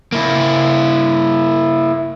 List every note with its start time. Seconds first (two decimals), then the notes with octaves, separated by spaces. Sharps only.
0.12 A#3 E4